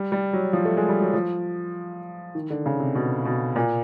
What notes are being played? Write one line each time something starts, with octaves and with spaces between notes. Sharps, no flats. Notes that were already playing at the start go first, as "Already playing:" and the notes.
Already playing: G3
G3
F#3
F3
A3
G#3
G3
F#3
F3
D#3
D3
C#3
C3
B2
B2
A#2